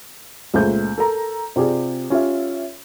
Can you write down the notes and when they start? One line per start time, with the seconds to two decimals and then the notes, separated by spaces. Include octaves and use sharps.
0.54 C#2 A#2 A3 G#4 C5 G6
0.98 A4 A#4 A#5
1.56 C3 F4 G4 G#4 D5
2.10 C#4 F4 G4 E5